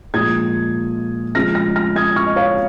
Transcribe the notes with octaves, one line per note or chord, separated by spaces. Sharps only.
A#2 F3 G#3 D#6 G#6
C#3 F3 G#3 F6 A#6
F6 A#6
F6 A#6
D#6 G#6
C#6 F6
D#5
C#5 F5